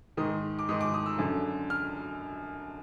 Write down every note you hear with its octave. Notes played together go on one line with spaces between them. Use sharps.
G#2 D#3 D#6
D6
G#2 D#3 D#6
D6
D#6
E6
F#2 D3
F6